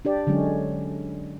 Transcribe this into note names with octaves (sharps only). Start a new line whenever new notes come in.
D4 G4 D5
D3 F#3 G#3 C#4